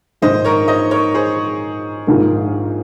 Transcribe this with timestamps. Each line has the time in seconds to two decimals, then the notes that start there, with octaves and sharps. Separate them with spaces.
0.22 A#1 G#2 D#3 C5 D#5
0.44 A#4 C#5
0.68 C5 D#5
0.91 A#4 C#5
1.14 G#4 C5
2.07 A#1 G#2 D#3 A#3 F4